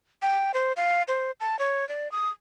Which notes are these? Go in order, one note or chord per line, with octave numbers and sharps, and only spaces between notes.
G5
C5
F5
C5
A5
C#5
D5
D#6